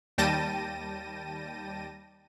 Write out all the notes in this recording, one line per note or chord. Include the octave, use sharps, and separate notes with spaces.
D#2 G3 G5 A5 A#6 D#7